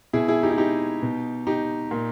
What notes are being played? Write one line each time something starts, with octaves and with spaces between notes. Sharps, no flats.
B2 E4 G#4
E4 G#4
D#4 G4
E4
D#4 G4
B2
D#4 G4
A#2